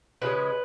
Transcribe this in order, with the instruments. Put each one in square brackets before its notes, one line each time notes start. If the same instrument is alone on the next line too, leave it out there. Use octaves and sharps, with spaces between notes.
[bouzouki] C#3 F3 G#3 B4